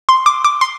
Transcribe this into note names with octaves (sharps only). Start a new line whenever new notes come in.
C6
D6
D6
C6